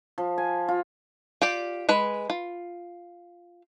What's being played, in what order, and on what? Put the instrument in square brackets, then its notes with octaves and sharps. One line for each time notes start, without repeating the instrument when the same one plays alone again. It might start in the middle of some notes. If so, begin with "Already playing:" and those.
[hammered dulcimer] F3
G#5
F4
[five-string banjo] F4 G4 D5
G#3 B4 B5
F4